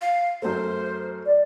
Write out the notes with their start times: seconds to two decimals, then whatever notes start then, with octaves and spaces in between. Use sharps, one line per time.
0.02 F5
0.42 F#2 A3 C5
1.26 D5